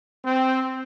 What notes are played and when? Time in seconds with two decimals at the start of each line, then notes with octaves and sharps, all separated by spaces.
0.24 C4